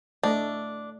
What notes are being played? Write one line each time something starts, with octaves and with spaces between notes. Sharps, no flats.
A3 D4 D#5